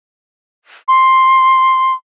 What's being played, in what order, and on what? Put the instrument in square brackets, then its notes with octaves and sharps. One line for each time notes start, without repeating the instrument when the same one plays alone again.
[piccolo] C6